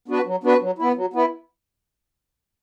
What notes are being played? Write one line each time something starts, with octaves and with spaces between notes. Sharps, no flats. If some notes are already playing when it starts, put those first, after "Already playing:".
B3 D4 F#4 B4
F#3
B3 D4 F#4 B4
F#3
B3 E4
F#3
B3 E4